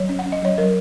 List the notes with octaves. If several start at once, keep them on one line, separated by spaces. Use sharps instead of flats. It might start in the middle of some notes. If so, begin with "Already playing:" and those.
Already playing: F#3 C#5
C#4
F#5
C#4
D#5
F#3 C#5
F#3 A#4